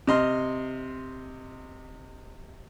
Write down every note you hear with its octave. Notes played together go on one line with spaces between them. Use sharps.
C3 D#5 C6 F6